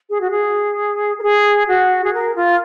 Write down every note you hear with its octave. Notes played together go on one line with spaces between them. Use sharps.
G#4
F#4
G#4
A#4
G#4
F#4
G#4
A#4
F4